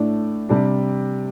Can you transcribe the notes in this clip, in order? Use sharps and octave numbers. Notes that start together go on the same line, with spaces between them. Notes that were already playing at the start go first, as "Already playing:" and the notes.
Already playing: A2 A3 D4
C3 G3 D4